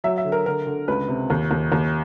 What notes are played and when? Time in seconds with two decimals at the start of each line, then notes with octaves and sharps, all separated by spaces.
0.04 F#3 E5
0.18 E5
0.24 D3
0.32 A#4
0.46 D3 A#4
0.66 D3
0.88 C#2 B4
1.09 C3
1.30 D#2
1.51 D#2
1.72 D#2